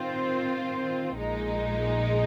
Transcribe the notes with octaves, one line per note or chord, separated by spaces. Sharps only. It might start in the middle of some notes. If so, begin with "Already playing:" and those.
Already playing: D#3 C4 F4 C5
A#1 A#2 G#3 D#4